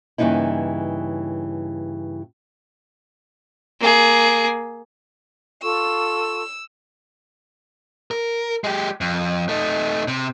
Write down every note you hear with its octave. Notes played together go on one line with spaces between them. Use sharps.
G2 C#3 E3 A#3 D#4 E4
A#3 G#4
F4 A4 C#6 E6
A#4
G#3 G4
F2
A3 D#4
C3